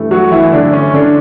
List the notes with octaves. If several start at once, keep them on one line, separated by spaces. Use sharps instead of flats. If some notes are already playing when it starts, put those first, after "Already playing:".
Already playing: G2 E3 A3
F#3 F#4
E3 E4
D3 D4
C#4
D3 D4